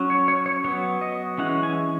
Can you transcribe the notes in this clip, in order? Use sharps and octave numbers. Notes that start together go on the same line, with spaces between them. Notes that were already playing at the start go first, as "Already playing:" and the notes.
Already playing: F#3 C#4
C#5
C#5
C#5
F#3 B3 C#5
D#5
E3 G#3 C#4 F#5
G#5